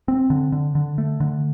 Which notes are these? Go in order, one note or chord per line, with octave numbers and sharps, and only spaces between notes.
C4
D3
D3
D3
A3
D3